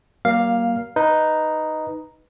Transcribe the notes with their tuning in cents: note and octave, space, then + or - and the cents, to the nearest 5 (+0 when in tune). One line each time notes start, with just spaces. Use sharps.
G3 -45 A#3 +15 F5 +0
D#4 +0 B4 +0